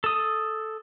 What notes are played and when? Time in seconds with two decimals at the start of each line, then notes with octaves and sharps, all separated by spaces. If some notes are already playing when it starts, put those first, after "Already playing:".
0.04 A4 D#6